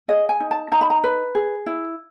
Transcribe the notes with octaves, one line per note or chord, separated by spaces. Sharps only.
G#4 D#5
G#5
D#4
A5
D#4 A#5
B5
A#5
B4
G#4
E4